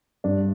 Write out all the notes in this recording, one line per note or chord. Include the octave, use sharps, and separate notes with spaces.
G2 D4